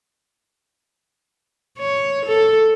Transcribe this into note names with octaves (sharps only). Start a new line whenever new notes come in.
C#5
A4